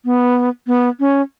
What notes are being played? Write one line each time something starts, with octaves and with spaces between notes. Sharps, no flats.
B3
B3
C#4